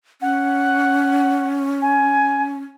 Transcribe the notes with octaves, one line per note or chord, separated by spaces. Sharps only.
C#4 F#5
G#5